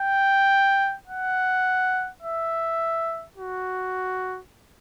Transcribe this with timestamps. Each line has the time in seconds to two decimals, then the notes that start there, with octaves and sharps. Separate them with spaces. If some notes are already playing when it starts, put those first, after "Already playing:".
Already playing: G5
1.07 F#5
2.22 E5
3.37 F#4